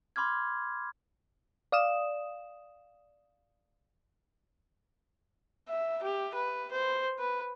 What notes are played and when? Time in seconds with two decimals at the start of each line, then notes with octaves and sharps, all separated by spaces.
0.16 B5 C6 D6 F6 G#6
1.72 D5 F5 D#6 E7
5.69 E5
6.03 G4
6.34 B4
6.72 C5
7.19 B4